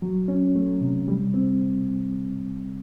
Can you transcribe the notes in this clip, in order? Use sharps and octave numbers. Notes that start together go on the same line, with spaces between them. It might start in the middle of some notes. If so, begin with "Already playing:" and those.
F#3
C#4
A3
C3
G3
C4